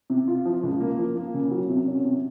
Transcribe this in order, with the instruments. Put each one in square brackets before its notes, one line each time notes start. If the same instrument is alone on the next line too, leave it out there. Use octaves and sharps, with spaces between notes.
[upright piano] C3
F4
F3
C#2
A#3
F3
A#3
C#3
F#3
C3
C#4
C3